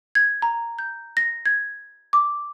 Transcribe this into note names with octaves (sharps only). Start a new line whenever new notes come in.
G#6
A#5
G6
A#6
G#6
D6